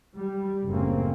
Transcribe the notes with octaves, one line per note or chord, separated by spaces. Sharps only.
G3
F#1 A2 A3 A#3 C4 C#4